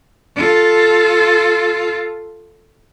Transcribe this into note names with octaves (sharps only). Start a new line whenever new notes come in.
F4 A4